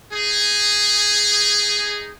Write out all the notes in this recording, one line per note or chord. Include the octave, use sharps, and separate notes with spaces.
D#4 G#4